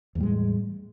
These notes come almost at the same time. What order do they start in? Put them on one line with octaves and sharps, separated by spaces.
E2 A2 G3 G#3